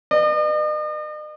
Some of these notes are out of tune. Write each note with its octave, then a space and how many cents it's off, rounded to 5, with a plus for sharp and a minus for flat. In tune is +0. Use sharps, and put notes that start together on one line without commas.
B4 +0 D#5 -45